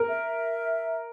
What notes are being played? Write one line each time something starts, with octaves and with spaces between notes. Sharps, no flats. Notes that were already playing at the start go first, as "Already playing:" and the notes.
Already playing: A#4
E5